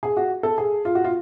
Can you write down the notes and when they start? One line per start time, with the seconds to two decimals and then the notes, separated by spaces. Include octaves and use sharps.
0.03 G#4
0.17 F#4
0.43 A4
0.58 G#4
0.85 F4
0.95 F#4
1.04 F4